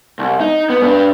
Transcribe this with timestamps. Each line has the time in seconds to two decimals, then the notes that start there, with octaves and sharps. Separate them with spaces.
0.19 C2
0.40 D#4
0.70 B3
0.83 D4 B4